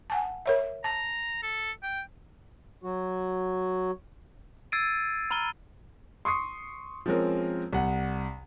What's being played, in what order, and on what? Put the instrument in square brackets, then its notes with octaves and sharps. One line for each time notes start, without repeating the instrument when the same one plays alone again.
[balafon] F#5 G#5 A5
A#4 C#5 E5
[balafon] A5 [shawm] A#5
[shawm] A4
G5
[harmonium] F#3 F#4
[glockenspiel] E6 G#6 A6 C7 D7 D#7
A#5 B5 F6 D#7 G7
[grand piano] C6 C#6 D#6 C7
F3 G#3 C4 C#4 A#4
C2 F#5